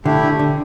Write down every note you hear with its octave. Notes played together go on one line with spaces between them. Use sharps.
D3 A3 E4 G4
D3
D3